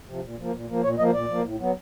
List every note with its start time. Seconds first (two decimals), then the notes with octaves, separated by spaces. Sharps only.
0.09 C3 F3
0.24 A#2
0.39 F3 A#3
0.54 A#2
0.69 F3 A#3
0.83 A#2 C#5
0.98 F3 A#3 D#5
1.14 A#2 D5
1.29 F3 A#3
1.44 A2
1.60 F#3 B3